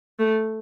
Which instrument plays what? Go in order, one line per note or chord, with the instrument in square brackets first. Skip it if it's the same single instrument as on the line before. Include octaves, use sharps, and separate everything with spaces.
[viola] A3